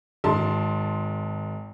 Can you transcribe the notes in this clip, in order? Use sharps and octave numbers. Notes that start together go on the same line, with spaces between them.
G#1 A5 C6